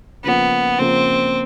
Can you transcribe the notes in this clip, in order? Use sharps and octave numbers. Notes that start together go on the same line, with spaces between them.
C#3 F3 A#3 B3
C#3 F3 A#3 C4